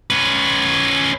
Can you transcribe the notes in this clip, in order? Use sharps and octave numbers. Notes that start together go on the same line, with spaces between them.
C#4 B4